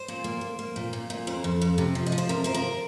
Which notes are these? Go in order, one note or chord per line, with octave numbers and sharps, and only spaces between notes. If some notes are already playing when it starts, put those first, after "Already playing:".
Already playing: C5
A#2
A#3
A#3
A#3
A#2
A#2
A#2
F2 C5
F2
F2
C3
F3
D#5
F3
C5
C3 A#4
F3 C5
A#4